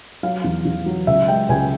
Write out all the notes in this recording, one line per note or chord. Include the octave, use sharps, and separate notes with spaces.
F#3 F5
E2
E2
F#3
C#2 E5
G#3 G5
C#2 G#5